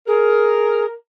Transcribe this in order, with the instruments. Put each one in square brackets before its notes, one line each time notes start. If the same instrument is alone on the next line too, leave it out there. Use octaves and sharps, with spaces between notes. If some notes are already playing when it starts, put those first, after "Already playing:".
[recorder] G#4 [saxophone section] A#4